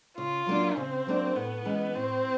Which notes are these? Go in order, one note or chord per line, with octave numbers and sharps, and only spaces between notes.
C#3 F4
F#3 A#3 D4
C#3 C4
F#3 A#3 D4
A2 B3
E3 G#3 C#4
A2 C4